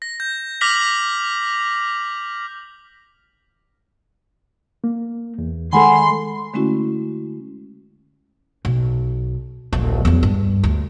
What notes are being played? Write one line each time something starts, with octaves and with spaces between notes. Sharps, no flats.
A#6
G6
D6 F6 A#6 B6 F7 F#7
A#3
E2
D#3 G#3 A4 F#5 G#5 B5 C6
D3 G#3 A3 C#4 E4 F#4
B1
D1 A#1
E2 F#3
G2
D2